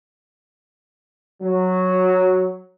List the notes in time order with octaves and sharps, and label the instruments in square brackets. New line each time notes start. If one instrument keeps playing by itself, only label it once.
[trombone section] F#3